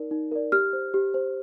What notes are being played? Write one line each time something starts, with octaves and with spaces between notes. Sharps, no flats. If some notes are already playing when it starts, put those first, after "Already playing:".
Already playing: D#4 A#4 D5
D#4
A#4 D5
G4 F6
C5
G4
C5